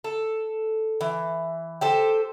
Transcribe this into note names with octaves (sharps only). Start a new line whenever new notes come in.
A4
E3
G4 A4 C5